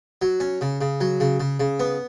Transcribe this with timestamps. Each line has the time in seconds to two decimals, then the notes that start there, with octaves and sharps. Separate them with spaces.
0.22 F#3
0.40 C#4
0.61 C#3
0.81 C#3
1.01 F#3
1.20 C#3
1.40 C#3
1.60 C#3
1.80 B3